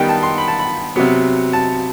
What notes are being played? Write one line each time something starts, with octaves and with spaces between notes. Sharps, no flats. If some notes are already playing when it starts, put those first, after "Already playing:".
Already playing: D#3 G3 B3 D#4 G5
A5
C6
B5
A5
B5
C3 F#3 B3
A5